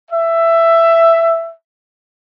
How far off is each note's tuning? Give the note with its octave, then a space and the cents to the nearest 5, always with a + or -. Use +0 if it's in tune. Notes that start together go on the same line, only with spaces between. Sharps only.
E5 +10